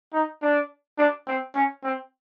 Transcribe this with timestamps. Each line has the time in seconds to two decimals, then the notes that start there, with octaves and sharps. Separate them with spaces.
0.13 D#4
0.42 D4
0.98 D4
1.27 C4
1.55 C#4
1.84 C4